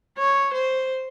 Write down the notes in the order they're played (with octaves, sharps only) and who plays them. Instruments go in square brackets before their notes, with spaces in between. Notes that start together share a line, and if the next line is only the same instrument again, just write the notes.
[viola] C#5
C5